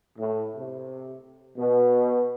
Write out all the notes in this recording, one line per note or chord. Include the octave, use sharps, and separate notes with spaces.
A2
C3
B2